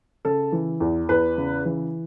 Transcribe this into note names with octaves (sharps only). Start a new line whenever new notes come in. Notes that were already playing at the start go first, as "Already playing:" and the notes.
C#3 A4
E3
E2
E2 B4
C#3
E3